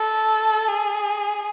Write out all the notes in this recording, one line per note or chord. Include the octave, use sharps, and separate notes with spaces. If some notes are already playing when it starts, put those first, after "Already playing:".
Already playing: A4
G#4